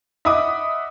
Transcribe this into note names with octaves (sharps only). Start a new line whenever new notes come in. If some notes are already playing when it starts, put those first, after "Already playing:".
D#5 E5 F#5 B5 D6 D#6